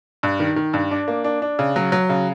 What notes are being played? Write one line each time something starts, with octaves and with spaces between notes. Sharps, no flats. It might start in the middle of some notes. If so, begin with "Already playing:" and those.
G2
D#3
D#3
G2
D4
A#3
D4
D4
C#3
F#3
F#3
C#3